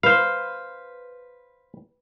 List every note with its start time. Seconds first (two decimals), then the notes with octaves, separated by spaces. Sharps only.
0.03 B4 C5 F5